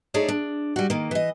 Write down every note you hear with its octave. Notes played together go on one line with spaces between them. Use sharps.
A3 D#4 G#4 A4 C#5 D5
D4
G3 F#4
D#3 A#3
E3 D#5